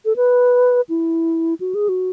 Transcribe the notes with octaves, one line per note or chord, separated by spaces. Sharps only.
A4
B4
E4
F#4
G#4
F#4